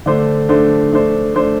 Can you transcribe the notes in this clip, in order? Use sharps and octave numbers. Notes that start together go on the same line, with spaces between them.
D3 A3 D4 C5
D3 A3 D4 C5
A3 D4 C5
A3 D4 C5